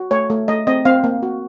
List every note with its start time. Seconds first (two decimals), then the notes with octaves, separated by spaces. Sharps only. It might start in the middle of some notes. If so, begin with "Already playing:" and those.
Already playing: F#4
0.11 A3 C#5
0.30 A3
0.48 A3 D#5
0.67 C4 D#5
0.85 C4 F5
1.04 A#3
1.22 F#4